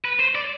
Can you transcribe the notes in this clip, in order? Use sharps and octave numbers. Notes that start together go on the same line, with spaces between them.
B4
C5
D5